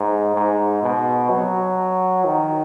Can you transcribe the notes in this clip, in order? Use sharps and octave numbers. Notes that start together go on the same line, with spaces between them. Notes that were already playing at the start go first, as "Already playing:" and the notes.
Already playing: G#2
G#2
B2
F#3
D#3